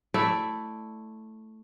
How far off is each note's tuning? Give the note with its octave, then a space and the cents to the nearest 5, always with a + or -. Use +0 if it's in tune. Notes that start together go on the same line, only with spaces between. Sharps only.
A3 +0 E4 +0 D5 +0